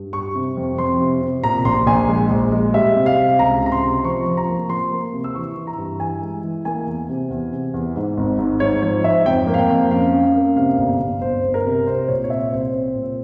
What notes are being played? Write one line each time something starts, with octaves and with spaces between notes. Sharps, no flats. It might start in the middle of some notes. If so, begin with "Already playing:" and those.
Already playing: G2
G3 C#6
C3
F2
F2 C6
C3
C3
A#2 A#5
A#1 C6
A#1 G#5
G#3
A#1
G#3
G3 E5
C3
F5
C3
C#2 A#5
C3
A#5
C6
C3
F3 C#6
F3
A#5
A#3
F3 C6
A#3
C3
E6
E3 C#6
E3
A#5
G2
E3 G#5
G#3
E3
A#3 G#5
E2
C3
E2
C3
E2
G#2
G#1
G#2
G#2 C#5
F3 C#5
G#2 E5
F2 G5
A#3
F5
G5
F2
C#4 F5
C#4
A#3
C3 F5
G1
G1
G1 C5
G1
A#4
C3
C2 C5
A#2 C#5
C#5
C4 E5
C2 C5
C4
A#2